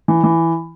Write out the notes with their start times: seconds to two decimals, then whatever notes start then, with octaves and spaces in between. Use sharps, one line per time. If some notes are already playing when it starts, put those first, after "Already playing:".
0.08 E3
0.24 E3